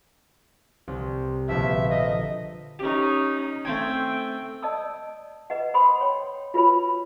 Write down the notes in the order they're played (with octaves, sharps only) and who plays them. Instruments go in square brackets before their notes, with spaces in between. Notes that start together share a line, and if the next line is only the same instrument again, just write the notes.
[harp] C2
[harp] A#1 B2 D3 [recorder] E5
[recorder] D#5
[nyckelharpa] C#4 D#4 [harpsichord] G4
[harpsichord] A3 C4 G#5 [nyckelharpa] G5
[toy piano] D5 D#5 A5 D#6 E6
B4 D#5 F#5
C5 B5 C6 D#6
C#5 G5
F4 F#4 B4 C#5 B5